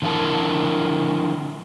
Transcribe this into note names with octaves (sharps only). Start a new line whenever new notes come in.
D3 F3 C#4 E4 A#4 A5